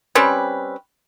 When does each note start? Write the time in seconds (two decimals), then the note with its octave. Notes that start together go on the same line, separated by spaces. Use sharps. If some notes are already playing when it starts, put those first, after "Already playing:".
0.15 G3 C4 C#4 B4